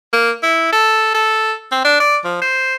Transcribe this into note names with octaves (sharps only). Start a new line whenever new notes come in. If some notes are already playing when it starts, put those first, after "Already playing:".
A#3
E4
A4
A4
C4
D4
D5
F3
C5